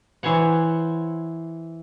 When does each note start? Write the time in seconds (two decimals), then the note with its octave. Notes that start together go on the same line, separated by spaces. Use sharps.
0.23 E3 C5 C#5 F#5